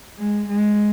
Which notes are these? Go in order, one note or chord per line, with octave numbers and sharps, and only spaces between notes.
G#3
G#3